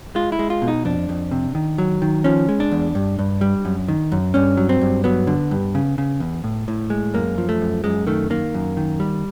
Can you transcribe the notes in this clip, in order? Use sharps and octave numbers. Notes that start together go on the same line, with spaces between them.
G#3 F4
E4
G#3
F4
B2
D#4
F2 D4
F2
C3
D#3
F#3
D#3
F3 C#4
G#3
D4
E2
G2
G2
G3
F#2
D#3
F#2
G2 C#4
F#3
C4
G2
F#3 B3
D3
G2
C#3
C#3
E2
A2
A2
G#3
F#2 A#3
F3
A3
F#2
F#2 G#3
D#3 A3
D#3 A#3
F#2
D#3
G3